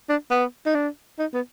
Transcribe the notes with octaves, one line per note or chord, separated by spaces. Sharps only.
D4
B3
D#4
D4
D#4
B3